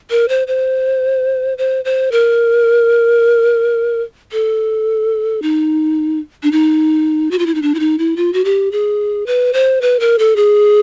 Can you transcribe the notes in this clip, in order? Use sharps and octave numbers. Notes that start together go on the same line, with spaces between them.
A#4
C5
C5
C5
C5
A#4
A4
D#4
D4
D#4
F#4
F4
E4
D#4
D4
E4
D#4
E4
F4
F#4
G4
G#4
B4
C5
B4
A#4
A4
G#4